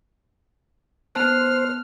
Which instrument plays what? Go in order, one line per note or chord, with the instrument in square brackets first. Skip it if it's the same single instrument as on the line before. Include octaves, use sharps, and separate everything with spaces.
[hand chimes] B3 A5 F#6 [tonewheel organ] C5 [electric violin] F6